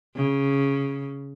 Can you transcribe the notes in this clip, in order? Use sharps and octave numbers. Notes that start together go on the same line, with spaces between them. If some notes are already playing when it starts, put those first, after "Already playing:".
C#3